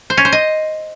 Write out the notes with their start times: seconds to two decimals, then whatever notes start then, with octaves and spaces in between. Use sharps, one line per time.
0.10 C5
0.17 C#4
0.25 C5
0.32 D#5